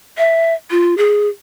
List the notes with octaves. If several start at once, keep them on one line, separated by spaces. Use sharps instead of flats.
E5
F4
G#4